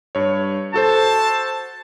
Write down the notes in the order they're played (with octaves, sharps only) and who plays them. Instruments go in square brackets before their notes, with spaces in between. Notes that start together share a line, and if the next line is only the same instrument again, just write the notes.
[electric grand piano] G2 C#5
[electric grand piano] F#4 A4 C5 [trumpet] A5